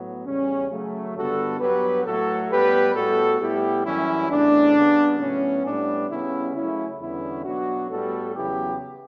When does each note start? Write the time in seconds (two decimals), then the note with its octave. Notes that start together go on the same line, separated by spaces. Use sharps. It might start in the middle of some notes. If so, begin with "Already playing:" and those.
Already playing: A2 F#3 B3
0.26 E2 C#3 G3 C#4
0.70 C#3 F#3 A3
1.16 G2 D3 G3 B3 F#4 A4
1.60 G2 F#3 B3 G4 B4
2.05 A2 F#3 A3 F#4 A4
2.51 A2 G3 B3 G4 B4
2.95 A2 G3 B3 F#4 A4
3.40 A2 G3 B3 E4 G4
3.86 F#2 E3 G3 C#4 E4
4.30 E2 C#3 E3 A3 D4
4.76 C#3 G3 B3
5.20 A2 F#3 B3 C#4
5.65 A2 G3 B3 D4
6.10 C#3 G3 B3 C#4 E4
6.55 C#3 F#3 A3 C#4 E4
7.01 E2 D3 G3 B3 C#4 E4
7.45 B2 F#3 B3 D4 F#4
7.90 A2 G3 B3 F#4 A4
8.35 E2 C#3 F#3 B3 E4 G4